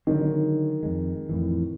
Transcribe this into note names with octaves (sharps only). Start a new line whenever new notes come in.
D3 D#3 F#3 G#3
F2 G#3
F2 A2 E3